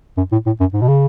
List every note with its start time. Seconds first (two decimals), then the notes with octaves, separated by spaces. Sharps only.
0.17 F#2
0.32 A2
0.46 A2
0.60 F#2
0.73 G#2
0.81 B2
0.88 C#3